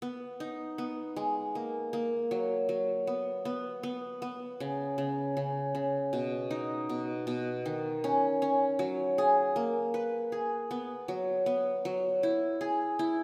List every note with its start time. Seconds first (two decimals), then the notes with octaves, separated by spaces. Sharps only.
0.02 B3
0.40 D#4
0.78 B3
1.16 G#3
1.55 A#3
1.93 A#3
2.31 F#3
2.69 F#3
3.07 B3
3.45 B3
3.83 B3
4.22 B3
4.60 C#3
4.98 C#3
5.37 C#3
5.75 C#3
6.13 B2
6.50 D#4
6.89 B2
7.27 B2
7.66 D#3
8.04 C#4
8.42 C#4
8.79 F#3
9.18 G#4
9.56 A#3
9.94 B4
10.32 G#4
10.71 B3
11.08 F#3
11.46 B3
11.85 F#3
12.23 E4
12.61 G#4
12.99 E4